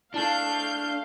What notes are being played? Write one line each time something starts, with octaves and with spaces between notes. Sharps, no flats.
A3 D4 E4 F5 A5 G6 G7